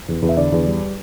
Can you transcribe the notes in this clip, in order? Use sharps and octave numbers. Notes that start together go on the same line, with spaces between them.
E2
E2
E5
D3 D5
E2
G3